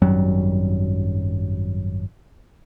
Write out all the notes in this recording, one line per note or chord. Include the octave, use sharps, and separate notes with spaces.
G#1 F#2 F#3 G3